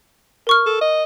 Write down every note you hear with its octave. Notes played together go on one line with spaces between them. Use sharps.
A#4 C#6 F6
A4
D#5